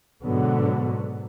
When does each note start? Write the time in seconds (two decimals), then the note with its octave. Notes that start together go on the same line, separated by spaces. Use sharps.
0.22 G#2 B2 D3 F#3 B3